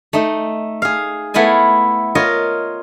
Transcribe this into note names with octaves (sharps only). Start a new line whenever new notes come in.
A3 D#4
G#4 F5
A3 B3 E4 F5 G#5
F4 A#4 C#5 D#5